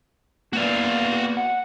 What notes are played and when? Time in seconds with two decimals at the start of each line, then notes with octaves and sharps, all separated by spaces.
0.53 A#3 B3 F#4 D5 F5
1.37 F#5